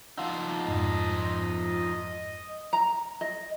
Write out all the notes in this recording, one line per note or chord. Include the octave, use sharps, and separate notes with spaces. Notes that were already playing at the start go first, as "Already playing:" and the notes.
F3 D#4 F5 F#5 E6
F2 G#2 D#5
A#5
D#5